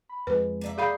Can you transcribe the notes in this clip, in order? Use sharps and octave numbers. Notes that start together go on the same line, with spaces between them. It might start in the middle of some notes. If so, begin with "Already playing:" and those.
B5
F2 G#3 B4
A#3 D5 E5
G#4 F5 B5 D#6 G6 C7